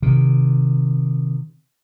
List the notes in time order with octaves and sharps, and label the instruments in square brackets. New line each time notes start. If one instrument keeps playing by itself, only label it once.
[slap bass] C3 D#3